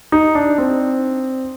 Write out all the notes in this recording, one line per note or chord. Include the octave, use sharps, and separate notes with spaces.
D#4
D4
C4